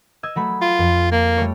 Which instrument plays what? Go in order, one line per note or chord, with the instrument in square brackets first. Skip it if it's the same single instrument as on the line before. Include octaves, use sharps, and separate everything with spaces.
[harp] D#5 E6 G#6
F#3 A3 B5
[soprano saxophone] F4
[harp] F2
[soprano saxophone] A#3
[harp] G3 A3 C#5